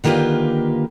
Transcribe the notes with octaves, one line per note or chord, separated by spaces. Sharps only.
D3 D#3 A#3 F4 G4 B4